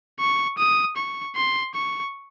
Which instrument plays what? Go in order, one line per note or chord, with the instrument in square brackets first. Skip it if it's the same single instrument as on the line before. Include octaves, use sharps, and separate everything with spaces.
[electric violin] C#6
D#6
C#6
C6
C#6